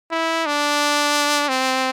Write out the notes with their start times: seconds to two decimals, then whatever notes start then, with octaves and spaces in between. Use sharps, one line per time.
0.11 E4
0.46 D4
1.49 C4